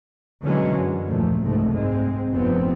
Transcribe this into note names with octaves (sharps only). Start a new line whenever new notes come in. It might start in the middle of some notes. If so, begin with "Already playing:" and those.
B2 D3 E3 F#3 G#3 C#4
F#2
D#2 A#2 F3 A3
F#1 C2 G#2 A3
G#2 G#3 C4
F1 G2 F3 B3 C4